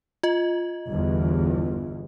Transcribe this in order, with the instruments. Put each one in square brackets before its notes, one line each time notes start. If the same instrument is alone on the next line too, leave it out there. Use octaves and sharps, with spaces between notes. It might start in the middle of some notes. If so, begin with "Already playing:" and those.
[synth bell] F4 D#5
[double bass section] G1 E2